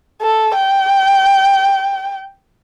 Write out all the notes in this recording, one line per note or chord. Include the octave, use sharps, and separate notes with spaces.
A4
G5